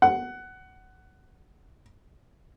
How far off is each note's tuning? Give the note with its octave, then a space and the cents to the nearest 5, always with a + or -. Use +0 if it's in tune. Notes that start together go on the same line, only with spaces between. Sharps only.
F#5 +15